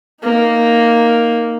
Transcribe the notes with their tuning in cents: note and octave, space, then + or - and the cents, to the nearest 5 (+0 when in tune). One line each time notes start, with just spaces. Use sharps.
A#3 +0 D#4 +0